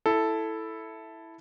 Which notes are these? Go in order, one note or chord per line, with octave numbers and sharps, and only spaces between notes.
E4 A4